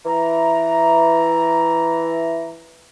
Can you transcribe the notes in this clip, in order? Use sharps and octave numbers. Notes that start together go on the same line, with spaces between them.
E3 A#5